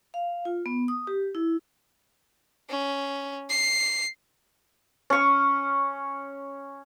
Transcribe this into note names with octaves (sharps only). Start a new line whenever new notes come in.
F5
F4
B3
D#6
G4
E4
C#4
C7
C#4 C#6